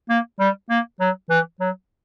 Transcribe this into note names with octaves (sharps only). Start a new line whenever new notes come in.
A#3
G3
A#3
F#3
E3
F#3